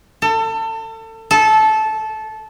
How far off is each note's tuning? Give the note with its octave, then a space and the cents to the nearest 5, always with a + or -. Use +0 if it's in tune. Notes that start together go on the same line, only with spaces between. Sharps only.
A4 +30
A4 -15